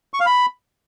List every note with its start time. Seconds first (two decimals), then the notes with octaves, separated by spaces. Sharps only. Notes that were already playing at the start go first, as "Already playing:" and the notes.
0.14 C#6
0.20 F5
0.26 B5